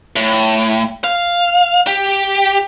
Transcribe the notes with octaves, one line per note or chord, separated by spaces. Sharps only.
A2
F5
G4